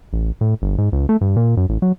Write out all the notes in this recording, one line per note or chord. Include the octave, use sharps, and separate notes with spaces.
A1
A2
G1
G#2
C#2
A3
G2
A#2
F#2
A1
F#3